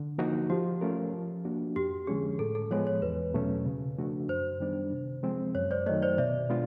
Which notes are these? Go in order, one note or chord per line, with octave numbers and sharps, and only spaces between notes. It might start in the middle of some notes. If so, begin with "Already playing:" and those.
Already playing: D3
F3 A#3 D#4 F#4
F3 G4
A3 C#4 F4 A#4
F3
A#3 D4 F#4
F2 G4
D3 F3 G#3 C#4 G#4
A2 A4
A4
F3 G#3 B3 C#5
C#5
E2 B4
B2 F#3 A3 C#4
C#3
F3 A3 D4 F#4
F#2 C5
D#3 G3 B3 D4
C3
F3 G#3 C4
F#2 C#5
C5 D5
D#3 F#3 A3 C#5 D#5
C5 D5
B2 D5 E5
G#3 B3 D4 F4